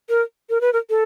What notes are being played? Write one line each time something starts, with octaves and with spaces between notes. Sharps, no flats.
A#4
A#4
B4
A#4
A4